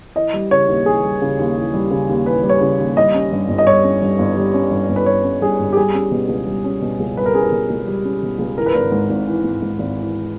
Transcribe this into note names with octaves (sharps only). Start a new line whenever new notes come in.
E3 D#5
G3
C#3 C#5
D#2
E3 G#4
G3
C#3
D#2
E3
G3
C#3
D#2
E3 B4
G3
C#5
C#3
D#2
G3 D#5
C#4
G2
G1
D#5
G3 C#5
C#4
G2
G1
G3
C#4
G2
G1
B4
G3 C#5
C#4
G2 G#4
G1
G4
G3 G#4
C#4
B2
C#2
G3
C#4
B2
C#2
G3 B4
A#4
C#4 G#4
A#4
B2
C#2
G3
C#4
B2
C#2
E3 A#4
B4
G#1 A#4
G#2
G#1
E3
G#1
G#2
G#1
E3